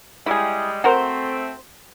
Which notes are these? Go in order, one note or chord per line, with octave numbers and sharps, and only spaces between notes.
G3 G#3 E4 G#4
A3 C4 F#4 A#4 C5